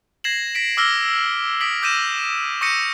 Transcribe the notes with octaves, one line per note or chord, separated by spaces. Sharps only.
G#6 A#6 C7 E7 F#7
A#6 B6 D7
D6 E6 F6 A#6 G7
D#6 B6 D7 F#7
D6 G6 A#6 D#7 E7
C#6 D#6 G6 A#6 C#7 D#7